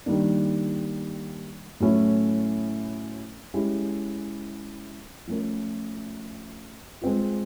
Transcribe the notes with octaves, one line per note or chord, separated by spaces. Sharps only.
D#3 G3 A#3 D4
A2 F#3 A3 C#4 E4
G#3 C#4 E4 G4
F3 A3 C#4 F4 A#4
G#3 C4 F4